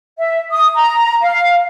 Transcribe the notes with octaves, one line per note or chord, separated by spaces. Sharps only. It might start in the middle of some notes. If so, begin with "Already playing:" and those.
E5
D#6
A#5
F5